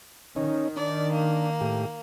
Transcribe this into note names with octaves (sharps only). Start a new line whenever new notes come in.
D#3 C#4 D#4
D4 D5
A#3
A2 G4